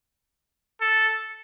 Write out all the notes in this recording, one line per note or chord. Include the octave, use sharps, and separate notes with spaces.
A4